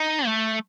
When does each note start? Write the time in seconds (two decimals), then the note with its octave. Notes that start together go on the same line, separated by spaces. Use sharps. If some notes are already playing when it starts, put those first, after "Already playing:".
Already playing: D#4
0.26 A3